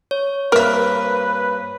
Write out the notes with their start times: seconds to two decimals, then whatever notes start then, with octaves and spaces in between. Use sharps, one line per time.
0.11 C#5
0.52 G2 A#3 C4 A#4 B4 E5